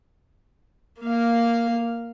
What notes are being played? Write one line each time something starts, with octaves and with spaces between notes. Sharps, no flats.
A#3 F5